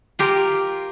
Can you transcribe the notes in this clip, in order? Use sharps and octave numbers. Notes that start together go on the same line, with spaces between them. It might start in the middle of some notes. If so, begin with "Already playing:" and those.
F4 G4 A#4